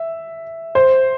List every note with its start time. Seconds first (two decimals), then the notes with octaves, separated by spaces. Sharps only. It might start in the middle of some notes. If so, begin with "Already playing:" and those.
Already playing: E5
0.75 C5